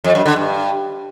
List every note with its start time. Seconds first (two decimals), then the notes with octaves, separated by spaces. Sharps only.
0.04 F2
0.15 F#2
0.26 D3
0.36 G2